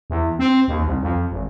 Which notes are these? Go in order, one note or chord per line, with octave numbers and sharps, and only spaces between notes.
E2
C4
D#2
C2
F2
G#1